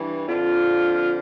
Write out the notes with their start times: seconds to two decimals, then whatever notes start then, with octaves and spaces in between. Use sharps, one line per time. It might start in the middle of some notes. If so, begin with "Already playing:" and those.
Already playing: G2 E3
0.25 F2 D3 F4